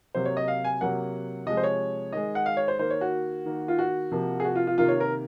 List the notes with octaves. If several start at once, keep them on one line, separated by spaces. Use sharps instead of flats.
C3 F#3 A#3 C5
C#5
D#5
F5
G#5
C3 F#3 A#3 F#5
C3 F3 G#3 D#5
C5
C#5
D#3 G#3 D#5
F#5
F5
C#5
C5
D#3 A#3 C5
C#5
F#4
D#3 A#3
F4
F#4
C3 F3 A#3
G#4
F#4
F4
F4
C3 D#3 A#3 F4
C#5
A#4